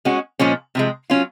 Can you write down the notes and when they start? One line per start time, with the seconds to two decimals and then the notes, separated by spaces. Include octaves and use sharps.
0.05 G#3 C#4 F#4
0.39 A#2 F3 G#3 C#4
0.75 C3 F3 G#3
1.10 F#3 C#4 F4